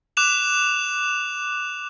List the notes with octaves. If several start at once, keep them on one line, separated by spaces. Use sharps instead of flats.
D6 F#6 E7 F7